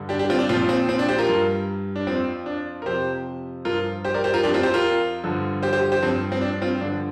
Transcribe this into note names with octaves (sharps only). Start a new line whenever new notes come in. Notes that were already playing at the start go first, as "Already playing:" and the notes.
Already playing: G2 D3 G3
D4 G4
D4 G4
C4 F4
D4
A#2 F3 C4 F4
C4
C4
D4
G4 C5
F4 A#4
G2 G3
D4
F2 F3 C4
D4
A#4
F2 C3 F3 G4 C5
G2 F3 F4 A#4
G4 C5
A#4 D5
G4 C5
F4 A#4
F2 F3 D4 G4
C4 F4
G4 C5
F4 A#4
G2 D3 F3
G4 C5
G4 C5
G4 C5
G2 F3 C4
C4
D4
C4 F4
G2 D3 F3 D4